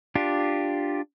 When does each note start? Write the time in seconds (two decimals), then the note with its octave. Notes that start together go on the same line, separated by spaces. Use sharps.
0.15 D4 F4 G4